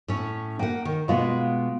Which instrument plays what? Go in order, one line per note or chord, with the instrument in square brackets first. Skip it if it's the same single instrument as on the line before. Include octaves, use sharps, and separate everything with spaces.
[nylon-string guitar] A2 C#4
[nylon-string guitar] A#3 F#5 [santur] G5
[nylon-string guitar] D#3
[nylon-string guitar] B2 G#3 B3 [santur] F4 D#6